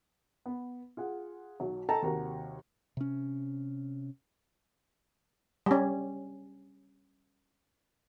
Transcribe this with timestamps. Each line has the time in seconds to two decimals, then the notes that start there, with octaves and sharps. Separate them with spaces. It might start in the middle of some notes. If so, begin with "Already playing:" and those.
0.46 B3
0.97 F4 G#4 F#5
1.60 B1 F#3
1.89 A4 D#5 G5 A5 A#5
2.03 D#2 C3 F#4 A#4 A#5
2.97 C3 C#4
5.66 G3 C#4